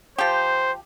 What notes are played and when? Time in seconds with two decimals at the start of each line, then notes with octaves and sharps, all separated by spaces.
0.18 F3 G4 C5